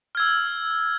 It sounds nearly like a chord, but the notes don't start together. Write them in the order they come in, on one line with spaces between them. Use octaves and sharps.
F6 G#6 E6